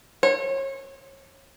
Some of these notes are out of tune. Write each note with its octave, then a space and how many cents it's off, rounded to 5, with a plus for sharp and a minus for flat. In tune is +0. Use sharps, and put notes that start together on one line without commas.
C#5 -30